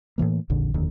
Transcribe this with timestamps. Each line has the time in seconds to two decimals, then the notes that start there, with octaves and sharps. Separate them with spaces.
0.18 A2 C3 E3 A#3
0.50 D#1 A#1 F2 D3
0.74 F1 D#2 D3